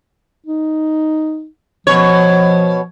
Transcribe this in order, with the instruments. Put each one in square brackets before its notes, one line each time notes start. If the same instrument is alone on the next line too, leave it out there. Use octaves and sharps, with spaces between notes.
[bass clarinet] D#4
[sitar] B2 C#5 [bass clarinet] F3